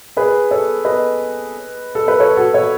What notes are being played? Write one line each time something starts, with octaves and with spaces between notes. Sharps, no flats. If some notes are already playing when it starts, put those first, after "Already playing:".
G#4 B4
A4 C#5
B4 D#5
A4
B4
A4 C#5
F#4 A4
A4 C#5